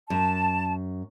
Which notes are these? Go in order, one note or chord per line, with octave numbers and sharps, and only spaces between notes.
F#2 A5